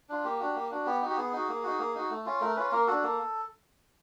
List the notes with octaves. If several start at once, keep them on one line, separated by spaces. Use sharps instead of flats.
D4 F4
A#3 G4
D4 F#4
A#3
D4 F#4
B3 G4
D#4 F#4
G4
B3 G#4
D#4 F#4
A#3
D#4 F#4
A#3
D#4 F#4
A3
C#4 F4
A3 A#4
C#4 F4 B4
A#3 A#4
D4 F#4 A4
A#3